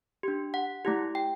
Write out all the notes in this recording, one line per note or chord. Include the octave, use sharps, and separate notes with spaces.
D4 G4
F#5
A3 E4 G4
G5